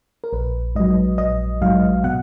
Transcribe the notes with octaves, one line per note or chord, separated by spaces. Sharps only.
A#4
A#1 B4
G#2 F#3 D#5
A#1 D#5
G#2 F#3 F5
B2 F#5